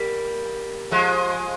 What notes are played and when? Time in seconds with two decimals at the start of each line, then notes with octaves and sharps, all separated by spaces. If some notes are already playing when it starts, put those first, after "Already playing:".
Already playing: G3 A#3
0.91 F3 G#3